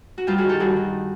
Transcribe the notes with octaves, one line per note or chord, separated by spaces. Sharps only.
F#4
G2 F4 G4
F#4 G#4
D#3
G4 A4
G2 F#4 G#4
D#3